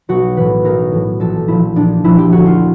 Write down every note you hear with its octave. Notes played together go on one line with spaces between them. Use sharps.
B1 F#4
A2 E3 B4
B1 A#4
A2 E3
A#1 A4
A#2 F3 E4
A#1 D4
A#2 F3 E4
G4
D2 F#4
F4